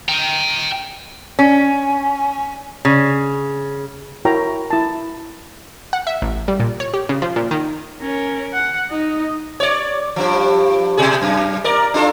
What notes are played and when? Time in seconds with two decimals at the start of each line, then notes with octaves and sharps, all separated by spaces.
0.09 G5 A#5
1.39 C#4
2.85 C#3
4.25 E4 F#4 A#4 C#5 G5 A#5
4.70 E4 A5
5.93 F#5
6.07 E5
6.22 A1
6.48 G3
6.60 A#2
6.80 C#5
6.94 G4
7.09 C#3
7.22 F3
7.36 A#2
7.51 D#3
8.01 C#4 A#4
8.53 F#5
8.90 D#4 D#5
9.60 C#5 D5
10.16 G2 F3
10.97 B2 G#4
11.22 F#2
11.64 A#4 D5
11.94 D4 F4 A4